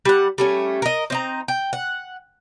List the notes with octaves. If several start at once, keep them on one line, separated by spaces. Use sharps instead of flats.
G3 F#5
G3 A3 C#4
A#4 D#5
C4 D#4 A#5
G5
F#5